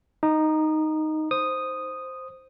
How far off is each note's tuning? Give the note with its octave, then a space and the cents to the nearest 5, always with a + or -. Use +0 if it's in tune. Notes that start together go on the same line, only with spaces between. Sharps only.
D#4 +0 D#6 -30
C5 +0 D#6 -5